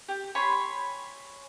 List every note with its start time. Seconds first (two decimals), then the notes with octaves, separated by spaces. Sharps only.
0.08 G4
0.35 C#5 G#5 B5 C6